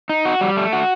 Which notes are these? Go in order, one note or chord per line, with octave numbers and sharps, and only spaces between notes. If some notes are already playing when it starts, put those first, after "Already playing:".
D#4
F#4
G3
A3
F#4